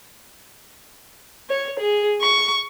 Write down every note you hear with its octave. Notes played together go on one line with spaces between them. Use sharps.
C#5
G#4
C#6